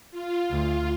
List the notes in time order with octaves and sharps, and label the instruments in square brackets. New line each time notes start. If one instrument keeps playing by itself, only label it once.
[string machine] F4
[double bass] D2